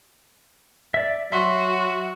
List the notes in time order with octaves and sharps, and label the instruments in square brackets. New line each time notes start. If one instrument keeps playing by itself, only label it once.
[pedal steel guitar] D5 E5
[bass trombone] F#3 [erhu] F#4 [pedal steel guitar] E5 C6